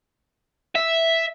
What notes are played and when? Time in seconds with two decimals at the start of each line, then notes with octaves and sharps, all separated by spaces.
0.75 E5